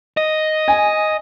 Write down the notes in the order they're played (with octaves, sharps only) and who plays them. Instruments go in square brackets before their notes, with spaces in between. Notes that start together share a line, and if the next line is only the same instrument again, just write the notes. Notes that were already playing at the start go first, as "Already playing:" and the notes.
[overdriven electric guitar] D#5
[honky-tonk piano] G#5